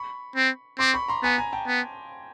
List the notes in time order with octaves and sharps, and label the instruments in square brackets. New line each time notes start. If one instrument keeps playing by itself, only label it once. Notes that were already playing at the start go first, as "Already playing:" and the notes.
Already playing: [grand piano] B5 C#6
[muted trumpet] C4
[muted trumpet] C4 [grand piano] C6 D6
[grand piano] B5 C#6
A#5 C6
[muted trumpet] B3 [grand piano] G#5 A#5
[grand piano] G#5 A#5
G5 A5
[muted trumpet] B3